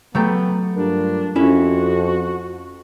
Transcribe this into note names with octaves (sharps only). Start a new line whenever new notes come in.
F#3 A3 B3 G4 A4 A#5
G2 D4 F4 A#4
F2 C#4 E4 F#4 E5